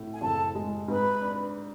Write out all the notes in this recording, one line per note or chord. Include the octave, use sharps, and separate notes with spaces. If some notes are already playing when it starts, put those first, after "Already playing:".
Already playing: A2
G#5
F#1 A4 A5
G#3
G#2 B4 B5
D4